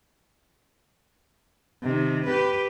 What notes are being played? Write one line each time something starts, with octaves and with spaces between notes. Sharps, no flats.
C3 D#3
G4 B4